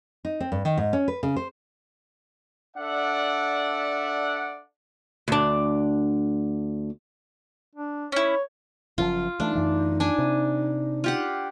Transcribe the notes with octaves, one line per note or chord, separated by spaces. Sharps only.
D#4
C4
G2
D#3
G#2
C#4
B4
C#3
C5
D4 A4 D5 E5 F#5
D2 D4
D4
C#4 E4 C#5
F#1 F#2 F3 F4
E3 A3 D4 D#4
F#2 E3 A3
D4 G#5
C3
F4 G4 F#5